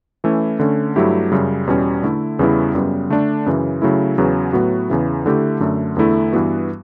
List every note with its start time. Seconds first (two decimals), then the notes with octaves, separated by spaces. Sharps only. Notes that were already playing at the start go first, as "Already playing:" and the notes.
0.24 E3 A3 C#4 E4
0.59 D3 A3 C#4
0.96 G2 F#3 A3 E4 G4
1.32 F#2 C#3 G3
1.67 E2 B2 G3 C#4
2.03 D3 A3 E4
2.39 E2 C#3 G3 B3 E4
2.75 F#2 C#3 G3 B3
3.10 D3 A3 D4
3.46 F#2 C#3 E3
3.82 C#3 F#3 A3 E4
4.18 E2 C#3 F#3 B3
4.53 A2 F#3 B3 F#4
4.90 E2 C#3 E3
5.26 D3 A3 E4 G4
5.60 F#2 D3 A3
5.96 E2 D3 A3 E4
6.33 G2 E3 B3 F#4